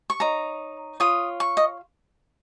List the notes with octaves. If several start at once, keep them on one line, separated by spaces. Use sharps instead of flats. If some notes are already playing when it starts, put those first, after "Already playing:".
C#6
D#4 C#5 A#5
F4 C#5 D#6
C#6
D#5